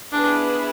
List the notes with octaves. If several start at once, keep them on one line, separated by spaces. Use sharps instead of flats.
B3 D4 E4 G#4 B4